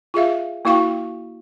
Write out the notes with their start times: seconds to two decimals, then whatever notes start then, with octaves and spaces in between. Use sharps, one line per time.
0.14 F4 G#4 E5 F5
0.65 A#3 E4 F#4 F5 G5 C#6